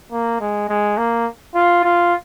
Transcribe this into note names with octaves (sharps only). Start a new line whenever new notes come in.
A#3
G#3
G#3
A#3
F4
F4